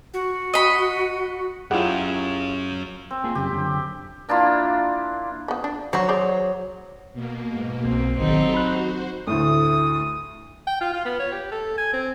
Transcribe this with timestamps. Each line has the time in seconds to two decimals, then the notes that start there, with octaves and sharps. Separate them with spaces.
0.14 F#4
0.54 D#5 B5
1.71 F#2 C#4 E4 F4 G4 G#4 F#5
3.11 C4
3.24 A#3 F4 G#4
3.35 F#2 C#3 G4
3.52 F#2 D3
4.29 A#3 D4 E4 F4
5.48 F3 B3
5.64 D4
5.93 F#3 C5 C#5
6.09 G#4 C5 D5
7.13 B2 A#3
7.52 G#2
7.85 B1 C4
8.18 G#1 D#3 F#3 C4 D#4 G4 A4
8.54 F#4 C5 B5 F#6
9.27 D2 A2 D#6
10.67 G5
10.81 F4
10.93 F4
11.05 B3
11.19 C#5
11.32 G4
11.51 A4
11.78 G#5
11.93 C4